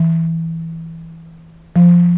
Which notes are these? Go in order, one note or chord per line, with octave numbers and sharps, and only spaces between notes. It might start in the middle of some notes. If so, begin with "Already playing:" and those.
Already playing: E3
F3